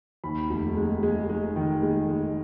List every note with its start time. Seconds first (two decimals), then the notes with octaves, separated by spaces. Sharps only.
0.24 D#2 B5
0.50 F1
0.77 G#3
1.03 G#3
1.29 G#3
1.56 D#3
1.83 G#3
2.09 G#3